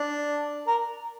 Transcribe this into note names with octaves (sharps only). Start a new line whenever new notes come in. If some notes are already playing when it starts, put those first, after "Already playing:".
Already playing: D4
A#4